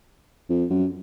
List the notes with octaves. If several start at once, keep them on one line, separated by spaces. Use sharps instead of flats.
F2
F#2